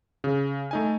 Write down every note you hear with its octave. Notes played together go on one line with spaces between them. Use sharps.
C#3
A3 D#4 G#5